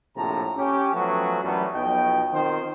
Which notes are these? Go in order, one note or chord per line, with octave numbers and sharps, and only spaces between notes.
A#1 A2 C3 F3 A5 A#5
C#4 G4
F3 F#3 A3 B3 C#4 F#4
F#2 E3 F#3 G3 A3 B3
B1 B2 F3 D#5 G5
D#3 C4 F4 C5